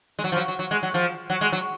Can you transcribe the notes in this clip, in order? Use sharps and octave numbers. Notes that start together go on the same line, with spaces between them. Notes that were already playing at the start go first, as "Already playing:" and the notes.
G#3
F#3
F3
F#3
F#3
F#3
G#3
F#3
F3
F#3
G#3
F#3